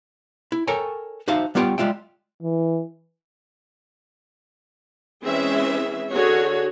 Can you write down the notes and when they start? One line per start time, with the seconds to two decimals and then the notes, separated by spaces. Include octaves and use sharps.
0.52 E4
0.68 A4 A#4 C#5 G5 G#5
1.28 D#4 F#4 C5 E5 F5 A5
1.55 G3 B3 F4 C#5 G5
1.78 G3 G#3 F4 E5 G5
2.42 E3
5.24 E3 G#3 C4 C#4 G#4 E5
6.12 D3 F#4 G#4 C#5